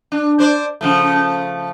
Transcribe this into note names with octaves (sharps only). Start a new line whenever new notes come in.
D4
D4 C5 D5
C#3 F3 A3